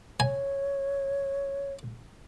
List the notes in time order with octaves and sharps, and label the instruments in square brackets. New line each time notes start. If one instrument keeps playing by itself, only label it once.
[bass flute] C#5 [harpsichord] G#5